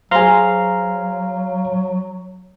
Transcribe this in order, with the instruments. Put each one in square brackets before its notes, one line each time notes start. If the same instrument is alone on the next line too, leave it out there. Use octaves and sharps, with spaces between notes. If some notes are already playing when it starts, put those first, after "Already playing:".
[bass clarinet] F#3 [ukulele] G#4 C5 [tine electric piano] F5 A#5 C6